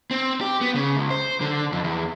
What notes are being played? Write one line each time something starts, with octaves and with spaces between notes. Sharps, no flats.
C4
G4
B3
C#3
C#2
C5
D3
F2
E2